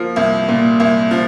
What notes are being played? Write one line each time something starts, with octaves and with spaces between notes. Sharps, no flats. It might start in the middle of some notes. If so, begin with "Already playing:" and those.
Already playing: F3 A#3
C2
A#2
C2
F3